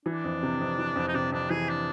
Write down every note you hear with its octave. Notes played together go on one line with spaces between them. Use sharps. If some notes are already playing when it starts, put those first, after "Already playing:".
E3 D4
F2
C3
F2
E3
F2
D#4
C3 D4
F2 D4
E3 G#4
D4